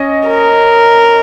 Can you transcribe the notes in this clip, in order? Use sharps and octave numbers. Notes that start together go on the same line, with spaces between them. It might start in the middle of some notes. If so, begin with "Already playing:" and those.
Already playing: C#4 D#5
A#4